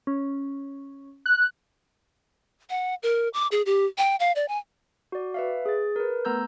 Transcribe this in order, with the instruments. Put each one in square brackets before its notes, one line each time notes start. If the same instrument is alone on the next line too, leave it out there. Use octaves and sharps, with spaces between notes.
[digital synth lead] C#4
[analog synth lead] F#6
[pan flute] F#5
A#4
D6
G#4
G4
G5
F5
D5
G#5
[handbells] F#4 D5
B4 E5 F5
G#4 A6
A#4 B4
A3 B3 A#5 E6 G6